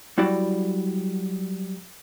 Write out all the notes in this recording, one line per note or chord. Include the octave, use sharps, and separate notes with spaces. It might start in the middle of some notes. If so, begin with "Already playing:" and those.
F#3 G3 E4 F#4 D5